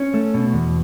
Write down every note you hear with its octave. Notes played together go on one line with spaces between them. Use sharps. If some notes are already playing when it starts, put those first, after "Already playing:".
Already playing: C#4
A3
B2
E2